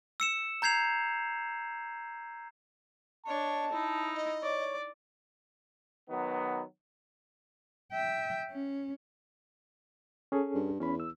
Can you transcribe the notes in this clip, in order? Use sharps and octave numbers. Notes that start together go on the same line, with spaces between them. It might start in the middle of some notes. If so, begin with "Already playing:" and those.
E6 C#7 E7
A#5 G6 G#6 C7 F7
D4 C#5 D#5 A5
D#4 E4
D#5
C#5 D5
D#3 F#3 B3
E5 G5
C#4
C#4 G#4 A4
G2
E2 C#4 B5
E6